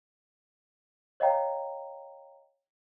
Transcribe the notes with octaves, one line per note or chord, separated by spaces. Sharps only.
C#5 D#5 F5 G5 A#5